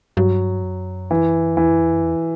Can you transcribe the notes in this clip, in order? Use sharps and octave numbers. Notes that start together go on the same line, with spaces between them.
G2 F#3
F#2
E3
E2 E3
F#2
E2
F#2
E2